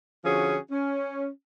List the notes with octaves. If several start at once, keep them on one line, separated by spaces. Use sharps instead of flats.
D3 F3 C#4 F#4 G#4
C#4